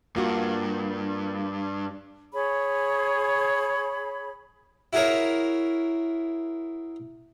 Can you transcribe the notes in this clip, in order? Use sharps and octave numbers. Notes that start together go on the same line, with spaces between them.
G2 A#3 F4 F#4
G#4 C#5 B5
E4 F#4 G#4 A#4 C#5